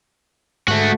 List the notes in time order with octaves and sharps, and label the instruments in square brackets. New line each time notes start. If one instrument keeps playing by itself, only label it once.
[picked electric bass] G#2 [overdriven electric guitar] A3 F#4